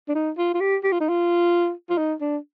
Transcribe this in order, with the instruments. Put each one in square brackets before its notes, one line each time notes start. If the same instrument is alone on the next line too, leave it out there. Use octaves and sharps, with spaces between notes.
[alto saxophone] D4
D#4
F4
F4
G4
G4
F4
D#4
F4
F4
D#4
D4